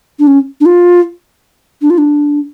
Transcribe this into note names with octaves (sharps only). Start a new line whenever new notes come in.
D4
C#4
D4
F4
D4
F4
D4